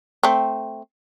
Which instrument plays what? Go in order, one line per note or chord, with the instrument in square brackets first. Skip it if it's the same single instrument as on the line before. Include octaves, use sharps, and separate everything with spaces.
[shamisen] A3 C4